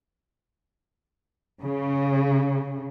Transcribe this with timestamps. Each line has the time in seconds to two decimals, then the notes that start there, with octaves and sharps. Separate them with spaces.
1.63 C#3